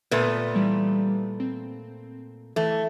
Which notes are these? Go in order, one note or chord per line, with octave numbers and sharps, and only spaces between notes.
A#2 A3 B3 B4 D#7
E3 G3
C4
E3 A3